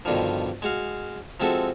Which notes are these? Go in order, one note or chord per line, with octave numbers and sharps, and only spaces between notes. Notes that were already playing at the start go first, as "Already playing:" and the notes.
G2 B2 D3 D#3 F3
G#3 F#4 F5
F3 G#3 C4 F#4 A4 E5